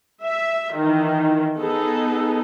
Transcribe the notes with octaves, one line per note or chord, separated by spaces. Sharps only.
E5
D#3 E3
B3 D#4 G#4 A4